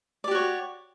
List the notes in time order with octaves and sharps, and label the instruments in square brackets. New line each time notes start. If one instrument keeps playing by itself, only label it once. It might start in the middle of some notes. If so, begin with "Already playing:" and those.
[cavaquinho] D5
G4
F#4
C#5